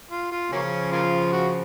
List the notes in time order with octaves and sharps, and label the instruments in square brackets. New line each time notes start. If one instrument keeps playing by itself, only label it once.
[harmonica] F4
F4
[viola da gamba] C#3 F3 [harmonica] F#3 A#3 C#4
[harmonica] A#3 C#4 F4
F#4